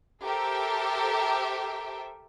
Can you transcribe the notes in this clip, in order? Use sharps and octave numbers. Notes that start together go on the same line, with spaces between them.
G4 A4 A#4 C5 E5 G5